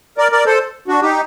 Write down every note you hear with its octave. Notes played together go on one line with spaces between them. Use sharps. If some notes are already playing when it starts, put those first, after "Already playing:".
A#4 D5
A#4 D5
A4 C5
D4 F#4
D#4 G4